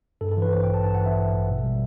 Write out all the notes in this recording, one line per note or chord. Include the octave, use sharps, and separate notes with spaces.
G2 A4
A4
E3 B4
A1 C5
G5
A1
A5
G2 A5
F#5
E3
E5
A1
A1
B2
G3